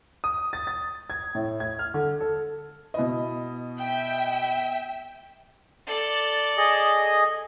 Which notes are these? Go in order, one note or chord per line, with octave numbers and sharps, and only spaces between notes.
D#6
A6
A6
G#6
A2
G#6
F6
D3
A4
B2 E4 D#5
E5 G5
A4 D5
G#4 D#5